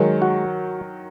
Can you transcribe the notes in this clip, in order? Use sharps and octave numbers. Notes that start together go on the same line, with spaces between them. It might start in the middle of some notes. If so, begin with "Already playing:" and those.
Already playing: D#3 F#3 G#3
F#4